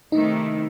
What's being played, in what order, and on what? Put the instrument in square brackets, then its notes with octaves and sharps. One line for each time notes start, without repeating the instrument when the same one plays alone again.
[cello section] C3 D#3 A3 E4 [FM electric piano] D#4